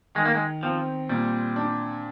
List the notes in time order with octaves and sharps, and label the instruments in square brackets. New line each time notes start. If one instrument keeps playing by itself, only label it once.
[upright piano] D#3 [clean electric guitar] G#3
[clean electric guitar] A#3
G#3
[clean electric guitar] F3 [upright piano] C4
[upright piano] A#2 [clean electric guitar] G3
[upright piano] D4